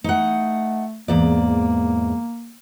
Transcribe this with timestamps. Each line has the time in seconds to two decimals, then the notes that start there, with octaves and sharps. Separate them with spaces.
0.04 A3 D#4 F#5
1.08 E2 G#2 A#3 D5